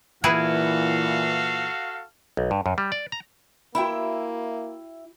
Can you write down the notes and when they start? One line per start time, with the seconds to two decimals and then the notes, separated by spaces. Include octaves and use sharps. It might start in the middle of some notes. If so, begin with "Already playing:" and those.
0.24 A#2 E3 E4 F#4 G#4 A4 B4 F5
2.37 B1
2.51 G2
2.66 F#2
2.78 G3
2.92 D5
3.12 A#5
3.75 A#3 E4 F#4 E5 G5 B5